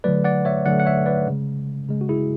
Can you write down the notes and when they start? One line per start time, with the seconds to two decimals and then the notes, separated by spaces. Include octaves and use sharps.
0.04 D3 F#3 A3 B4 D5
0.24 D5 F#5
0.45 C#5 E5
0.66 D3 F#3 A3 D5 F#5
0.80 F#5
0.86 C#5 E5
1.06 B4 D5
1.27 C#3 G#3
1.89 C#3 G#3
2.01 F#4
2.09 E4 G#4